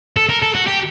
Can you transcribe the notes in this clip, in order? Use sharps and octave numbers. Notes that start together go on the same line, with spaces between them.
A4
A#4
A4
F#4
G4